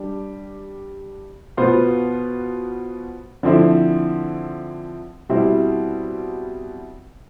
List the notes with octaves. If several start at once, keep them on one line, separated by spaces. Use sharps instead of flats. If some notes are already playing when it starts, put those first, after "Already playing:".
Already playing: G3 D4 G4
B2 B3 F4 C5
D3 F3 C4 E4
B2 G3 C4 E4